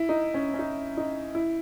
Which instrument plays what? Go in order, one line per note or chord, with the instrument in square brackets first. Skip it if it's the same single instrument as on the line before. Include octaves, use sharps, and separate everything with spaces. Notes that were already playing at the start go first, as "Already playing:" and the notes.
Already playing: [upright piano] E4
D#4
C#4
C#4
D#4
D#4
E4